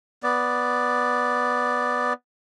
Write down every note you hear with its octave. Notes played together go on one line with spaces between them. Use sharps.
B3 D5